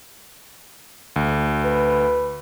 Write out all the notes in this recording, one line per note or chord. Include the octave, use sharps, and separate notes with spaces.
D2
B4